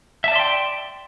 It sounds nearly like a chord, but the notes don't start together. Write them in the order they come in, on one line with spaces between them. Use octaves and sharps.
E5 A5 D5 C6 G5